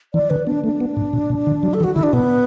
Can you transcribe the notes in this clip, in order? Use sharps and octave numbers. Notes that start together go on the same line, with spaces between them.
E3 D5
D3 B4
B3 D4
A3 D4
B3
A2
B2
B2
D3
F#3
A4
E3
F#4
D3 E4
D4
B2 B3